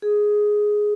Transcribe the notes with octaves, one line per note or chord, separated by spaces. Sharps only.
G#4